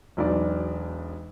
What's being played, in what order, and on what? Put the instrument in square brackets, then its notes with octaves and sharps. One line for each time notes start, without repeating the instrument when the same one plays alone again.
[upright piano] E1 B1 D5